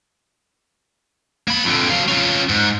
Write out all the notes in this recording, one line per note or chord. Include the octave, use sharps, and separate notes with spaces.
A#3 B5
F2 D3
F#3 F5
C#4 F4
G#2